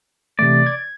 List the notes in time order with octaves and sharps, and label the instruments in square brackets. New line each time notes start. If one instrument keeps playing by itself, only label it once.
[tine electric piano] C3 E3 A3 [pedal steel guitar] D5
[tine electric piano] G#6